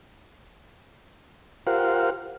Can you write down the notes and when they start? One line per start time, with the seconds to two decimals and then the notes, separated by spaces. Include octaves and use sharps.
1.67 F4 G4 A#4 C5 F5 F#5